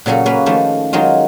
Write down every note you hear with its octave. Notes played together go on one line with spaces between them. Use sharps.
A#2 C#3 F#3 C#4 A4
A#3 C#4 B4
D#3 F3 A3
D#3 F#3 G#3 F4